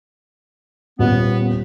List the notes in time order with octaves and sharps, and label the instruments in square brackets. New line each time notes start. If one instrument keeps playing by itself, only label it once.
[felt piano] D#1 [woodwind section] B3